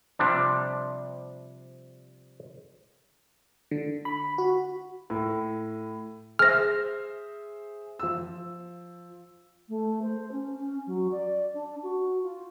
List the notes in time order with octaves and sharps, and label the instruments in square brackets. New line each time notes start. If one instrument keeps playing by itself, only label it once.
[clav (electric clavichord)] C3 F3 G3 D4
[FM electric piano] D3
B5
F#4
[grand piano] A2
[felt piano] G#4 C5 E5 [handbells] F6 A#6
[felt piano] F3 E6
[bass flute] A3
C5
C#4
C#4
F#3
D5
D4
F#4
F4